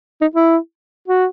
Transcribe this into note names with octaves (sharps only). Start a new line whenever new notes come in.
D#4
E4
F#4